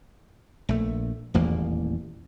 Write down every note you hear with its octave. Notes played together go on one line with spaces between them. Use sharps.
A#1 A3
D#1 A1 E2 A#3